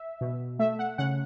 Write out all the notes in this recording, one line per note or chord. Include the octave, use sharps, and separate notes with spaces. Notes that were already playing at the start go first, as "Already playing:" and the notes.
Already playing: E5
B2
A3 E5
F#5
C#3 F#5